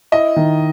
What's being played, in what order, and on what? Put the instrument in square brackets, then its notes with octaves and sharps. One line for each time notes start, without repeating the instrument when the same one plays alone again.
[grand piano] E4 [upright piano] D#5
[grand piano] D#3